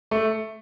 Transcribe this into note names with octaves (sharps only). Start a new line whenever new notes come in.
A3